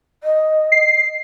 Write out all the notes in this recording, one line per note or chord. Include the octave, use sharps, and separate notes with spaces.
D#5
C7